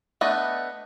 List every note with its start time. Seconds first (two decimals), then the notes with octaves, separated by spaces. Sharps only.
0.21 A3 B3 D4 D#5